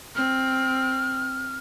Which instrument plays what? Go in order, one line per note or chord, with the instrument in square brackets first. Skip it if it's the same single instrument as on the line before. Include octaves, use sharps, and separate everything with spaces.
[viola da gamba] C4 [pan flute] F6